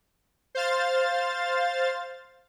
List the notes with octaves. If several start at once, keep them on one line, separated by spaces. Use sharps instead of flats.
C5 F5 A6